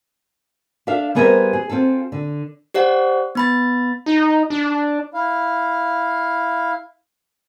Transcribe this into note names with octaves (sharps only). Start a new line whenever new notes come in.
D4 A4 E5 F5
G3 B3 G#4 A#4 C5 E5
G#4
C4 F4 G#4 A4
D3
G4 C5 D5 F#5
B3 B5 A6
D#4
D4
E4 F5